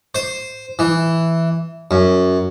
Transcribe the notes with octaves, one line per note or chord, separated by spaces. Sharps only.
C5
E3
F#2